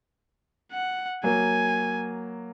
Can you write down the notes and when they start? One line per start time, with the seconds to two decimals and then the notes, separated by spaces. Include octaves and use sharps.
0.72 F#5
1.24 F#3 A#3 G#5